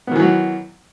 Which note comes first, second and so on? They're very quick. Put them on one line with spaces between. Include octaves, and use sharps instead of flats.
B3 D#3 E3 F#3